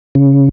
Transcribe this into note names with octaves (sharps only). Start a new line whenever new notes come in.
C#3